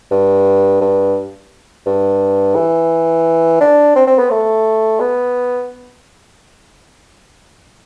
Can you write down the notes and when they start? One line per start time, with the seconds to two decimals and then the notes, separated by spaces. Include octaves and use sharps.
0.11 G2
0.81 G2
1.86 G2
2.56 E3
3.61 D4
3.96 C4
4.07 C4
4.19 B3
4.31 A3
5.00 B3